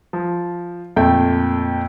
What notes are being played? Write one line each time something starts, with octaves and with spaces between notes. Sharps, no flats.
F3
F2 A#2 A3 G5